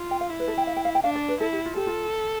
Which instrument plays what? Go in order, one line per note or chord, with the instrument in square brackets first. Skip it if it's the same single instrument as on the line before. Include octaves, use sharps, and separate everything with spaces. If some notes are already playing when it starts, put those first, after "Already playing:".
Already playing: [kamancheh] F4
[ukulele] G5
F5
[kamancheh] E4
[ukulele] B4
A4
G5
F5
G5
F5
G5
[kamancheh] D4 [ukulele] F5
[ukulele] D5
B4
[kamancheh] E4 [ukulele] A4
[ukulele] G4
F4
[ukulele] G4 [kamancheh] A4
[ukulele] F4